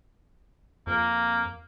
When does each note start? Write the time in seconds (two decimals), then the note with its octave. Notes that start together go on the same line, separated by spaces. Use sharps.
0.87 F2 A#3